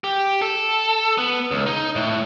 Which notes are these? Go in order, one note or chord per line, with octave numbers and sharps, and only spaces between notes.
G4
A4
B3
C#2
D#4
A2